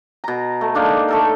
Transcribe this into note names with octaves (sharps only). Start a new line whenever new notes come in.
B2 A#5
A3
G#3 A#3 D4 D#4
A3 A4 A#4